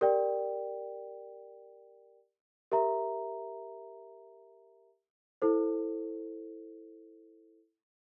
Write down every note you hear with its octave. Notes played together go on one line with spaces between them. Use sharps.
G4 A#4 D5 G5
G4 A#4 E5 A#5
E4 A4 C5